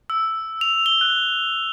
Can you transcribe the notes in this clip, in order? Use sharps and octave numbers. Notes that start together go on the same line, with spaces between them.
E6
F7
G7
F#6